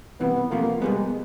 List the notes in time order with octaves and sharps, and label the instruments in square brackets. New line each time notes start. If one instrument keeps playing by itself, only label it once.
[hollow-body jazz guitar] C2 C3 E3 [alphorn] B3
[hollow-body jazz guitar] C3 F3 A3 [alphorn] A#3
[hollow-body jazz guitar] B2 G3 B3 [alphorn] G#3